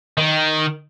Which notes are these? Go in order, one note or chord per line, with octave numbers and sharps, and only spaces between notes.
D#3